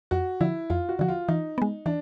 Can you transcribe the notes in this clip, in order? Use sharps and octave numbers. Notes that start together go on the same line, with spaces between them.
F2 F#4
D3 F3 E4
F2 F4
F#4
D3 F3 F#4
F4
E3 D#4
G#3 B3
E3 D4